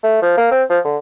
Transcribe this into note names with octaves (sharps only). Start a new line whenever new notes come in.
A3
F3
A#3
C4
F3
D3